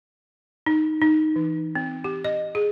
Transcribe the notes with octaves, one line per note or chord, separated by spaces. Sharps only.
D#4
D#4
E3
C4
G4
D#5
G#4